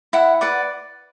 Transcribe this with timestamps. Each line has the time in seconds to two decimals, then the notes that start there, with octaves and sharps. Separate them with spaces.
0.13 E4 F#5
0.41 B4 D5 F#5